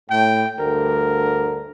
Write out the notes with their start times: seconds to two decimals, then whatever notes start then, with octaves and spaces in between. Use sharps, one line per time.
0.10 A2 G5
0.60 D2 G2 D3 A#4